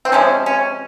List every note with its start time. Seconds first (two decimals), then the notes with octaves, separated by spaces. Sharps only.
0.05 C4
0.12 C3 F3 G#3 C#4
0.46 C#4